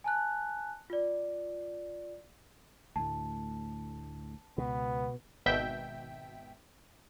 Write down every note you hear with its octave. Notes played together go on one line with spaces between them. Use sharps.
G#5 A5 F#6
F4 D5
D2 A2 A5
C#2 B2 B3
G#1 B2 E5 G5